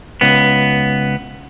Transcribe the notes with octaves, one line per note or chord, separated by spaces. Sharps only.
C#2 B3